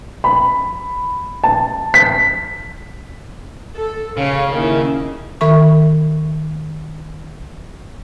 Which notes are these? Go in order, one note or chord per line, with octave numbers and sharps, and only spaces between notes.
B5
A5
B6
A4
C#3 C#5 F5
D#3 A#3 E4
D#3 E5 C#6